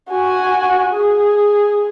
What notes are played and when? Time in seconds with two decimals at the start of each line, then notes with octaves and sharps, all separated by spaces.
0.11 F#4 G#5
0.93 G#4